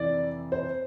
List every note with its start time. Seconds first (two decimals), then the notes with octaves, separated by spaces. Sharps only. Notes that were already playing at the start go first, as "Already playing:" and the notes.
Already playing: F2 C3 E3 D5
0.52 C5